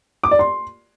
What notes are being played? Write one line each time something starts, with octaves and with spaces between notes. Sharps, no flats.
D6
D5
C6